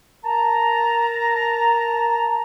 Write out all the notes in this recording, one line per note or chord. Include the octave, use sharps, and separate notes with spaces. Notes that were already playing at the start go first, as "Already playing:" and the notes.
A#4 A5 A#5